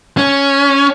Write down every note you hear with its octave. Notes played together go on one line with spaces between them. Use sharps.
C#4